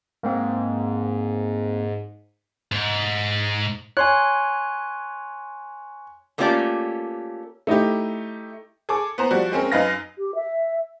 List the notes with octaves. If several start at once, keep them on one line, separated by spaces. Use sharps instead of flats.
G#2 A#3 C4
G#2
C#5 G#5 C6 F#6
A3 A#3 C#4 F4 G4 D5
A3 D#4 E4 G4
G#4 A4 D6
B3 C5 A#5
F3 G3 F#4 D5
G#3 C4 C#4 A#4
F#2 D#4 B4 F5 A#6
G4
E5